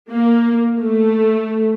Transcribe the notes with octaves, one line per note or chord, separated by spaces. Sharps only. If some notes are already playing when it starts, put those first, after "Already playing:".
A#3
A3